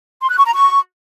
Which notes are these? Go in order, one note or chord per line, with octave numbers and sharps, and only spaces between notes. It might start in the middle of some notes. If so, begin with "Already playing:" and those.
C6
F#6
C#6
A#5
C#6